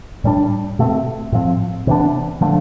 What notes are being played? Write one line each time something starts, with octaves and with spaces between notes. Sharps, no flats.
A2 G3 D4
B2 A3 C4
A2 F3 C4
C3 E3 B3 D4
D3 F3 A3 D4